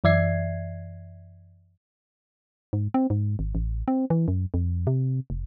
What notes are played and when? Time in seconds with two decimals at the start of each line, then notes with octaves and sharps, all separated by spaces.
0.04 F#2 E3 D5 E5 G#6 C7
2.73 G#2
2.94 C4
3.10 G#2
3.39 G#1
3.55 A1
3.88 C4
4.10 E3
4.28 F#2
4.54 F2
4.87 C3
5.30 F1